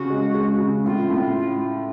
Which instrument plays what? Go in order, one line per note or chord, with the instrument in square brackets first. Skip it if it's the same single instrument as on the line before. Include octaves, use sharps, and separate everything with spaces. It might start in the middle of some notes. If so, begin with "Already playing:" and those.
Already playing: [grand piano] C#3 [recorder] F#4
[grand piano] G#3
G#3
C#3
[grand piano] A2 [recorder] F4
[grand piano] A2